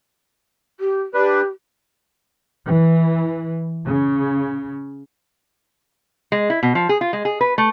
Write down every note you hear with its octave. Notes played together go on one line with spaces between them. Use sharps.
G4
D4 G4 B4
E3
C#3
G#3
E4
B2
F3
G#4
F4
G#3
G#4
B4
A3